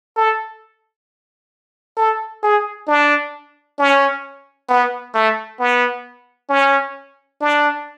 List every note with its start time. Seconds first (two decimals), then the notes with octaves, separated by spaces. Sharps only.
0.17 A4
1.97 A4
2.43 G#4
2.87 D4
3.79 C#4
4.69 B3
5.14 A3
5.60 B3
6.50 C#4
7.41 D4